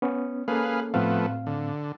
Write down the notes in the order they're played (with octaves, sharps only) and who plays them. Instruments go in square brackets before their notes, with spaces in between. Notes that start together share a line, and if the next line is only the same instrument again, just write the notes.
[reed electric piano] B3 C#4
[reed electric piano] A#3 C#4 A4 [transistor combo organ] G#4 B4 F5
[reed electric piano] A2 C4 F5 [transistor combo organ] F3 A3 B3
[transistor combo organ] D3